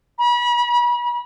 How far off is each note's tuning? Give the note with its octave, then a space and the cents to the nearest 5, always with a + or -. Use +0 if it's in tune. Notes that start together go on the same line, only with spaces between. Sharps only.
B5 -35